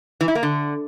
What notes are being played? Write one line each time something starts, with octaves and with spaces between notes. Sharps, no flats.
E3
E4
A#3
D3